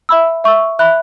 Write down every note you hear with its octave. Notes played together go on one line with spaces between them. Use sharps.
E5 B5 E6
E5 C#6 E6
E5 B5 F#6